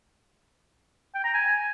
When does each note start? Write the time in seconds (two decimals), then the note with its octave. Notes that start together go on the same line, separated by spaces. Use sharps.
1.15 G5
1.24 A#5
1.34 G#5